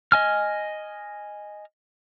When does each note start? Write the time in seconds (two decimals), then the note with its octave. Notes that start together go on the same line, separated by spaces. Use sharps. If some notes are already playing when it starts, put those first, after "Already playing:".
0.12 D#5 G#5 F6